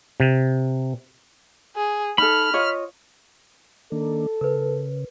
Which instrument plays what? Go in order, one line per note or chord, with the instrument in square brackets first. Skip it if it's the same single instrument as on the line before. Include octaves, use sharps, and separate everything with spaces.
[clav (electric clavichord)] C3
[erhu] G#4
[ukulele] D#4 A4 [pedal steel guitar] B5 [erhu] F6
[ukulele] F4 C#5 D#5
[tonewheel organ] D#3 A#3 D4 [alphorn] A4
[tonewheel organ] C#3 [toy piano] A#4 B4